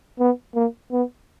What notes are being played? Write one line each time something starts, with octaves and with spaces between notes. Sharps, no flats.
B3
A#3
B3